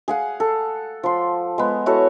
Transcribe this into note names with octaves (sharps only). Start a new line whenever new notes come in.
G#4 F5 F#5
A4
F3 C6
G#3 B3
E4 F#4 A4 C#5